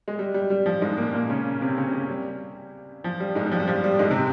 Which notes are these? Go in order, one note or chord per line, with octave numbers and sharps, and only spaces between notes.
G#3
G3
G3
G3
F3
G#2 G#3
A#2 A#3
A#2 A#3
C#3 C#4
C3 C4
C#3 C#4
C4
C#3 C#4
G3
F3
G3
G#2 G#3
G3
F3
G3
F3
G3
G#2 G#3
C3 C4